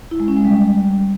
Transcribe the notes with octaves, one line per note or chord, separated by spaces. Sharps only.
E4
G#3
C#4
G#3
G3